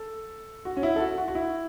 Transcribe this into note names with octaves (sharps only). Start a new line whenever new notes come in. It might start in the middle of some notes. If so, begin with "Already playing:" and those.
Already playing: A4
F#4
C#4
E4
A4
F#4
F#4
F#4
E4